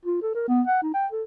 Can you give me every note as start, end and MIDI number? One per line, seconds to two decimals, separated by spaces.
0.05 0.19 65
0.22 0.32 69
0.35 0.45 70
0.48 0.62 59
0.67 0.79 78
0.83 0.90 63
0.94 1.07 79
1.12 1.23 69